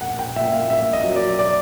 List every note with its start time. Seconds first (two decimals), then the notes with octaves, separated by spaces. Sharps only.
0.01 A#1 F#5
0.19 G5
0.36 A#2 E5
0.53 F5
0.70 A#1 E5
0.93 D#5
1.03 F#3
1.16 D5
1.39 D5